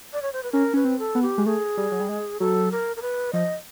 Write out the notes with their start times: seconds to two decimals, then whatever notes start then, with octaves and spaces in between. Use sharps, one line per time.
0.13 D5
0.22 C#5
0.33 C5
0.43 B4
0.52 C#4 A#4
0.74 C#4 B4
0.85 C4
0.99 A4
1.15 B3
1.22 G4
1.38 G#3
1.46 A3 G#4
1.77 G3
1.92 F#3
2.00 G3
2.09 G#3
2.40 F#3 A4
2.72 A#4
2.96 A#4
3.02 B4
3.33 F3 D#5